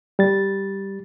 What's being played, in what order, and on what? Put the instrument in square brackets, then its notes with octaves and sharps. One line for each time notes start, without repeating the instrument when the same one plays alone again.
[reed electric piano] G3 A6